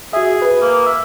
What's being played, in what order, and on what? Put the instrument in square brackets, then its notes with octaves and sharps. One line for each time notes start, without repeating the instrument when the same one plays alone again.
[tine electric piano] F#4 E5 [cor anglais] G#4
[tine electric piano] B4
[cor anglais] A#3
E5